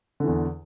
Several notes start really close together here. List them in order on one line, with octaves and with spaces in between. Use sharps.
D3 E3 E2